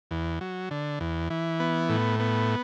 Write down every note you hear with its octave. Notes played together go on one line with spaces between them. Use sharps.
E2
F#3
D3
E2
E3
B3
A2
B3